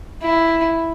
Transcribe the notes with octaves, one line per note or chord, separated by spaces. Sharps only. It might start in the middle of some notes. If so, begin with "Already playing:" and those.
E4